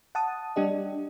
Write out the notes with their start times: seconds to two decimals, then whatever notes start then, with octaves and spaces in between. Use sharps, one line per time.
0.15 F#5 A5 D#6
0.56 G3 D4 G4 D#5